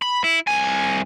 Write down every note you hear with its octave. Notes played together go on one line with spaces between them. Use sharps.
B5
E4
C2 G#5